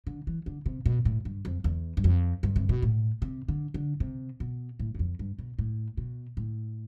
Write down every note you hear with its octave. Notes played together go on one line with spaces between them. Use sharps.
D3
E3
D3
C3
B2
A2
G2
F2
E2
G2
F2
G2
C3
B2
A2
C3
D3
D3
C3
B2
A2
G2
F2
G2
B2
A2
B2
A2